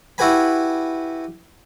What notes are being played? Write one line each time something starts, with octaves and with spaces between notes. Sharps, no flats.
E4 F#4 G4 B4 G#5 B5